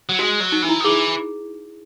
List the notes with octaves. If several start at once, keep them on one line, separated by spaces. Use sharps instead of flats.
F#3
G#3 F#4
F#3
D#4
E3 D#4
E4
D#3
E3 G#4